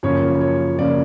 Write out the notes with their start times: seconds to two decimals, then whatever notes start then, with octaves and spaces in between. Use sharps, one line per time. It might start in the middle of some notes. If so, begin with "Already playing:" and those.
0.03 F#2 C#3 F3 A#3 C#4 C#5
0.41 C#5
0.79 C#3 F3 A#3 C#4 D5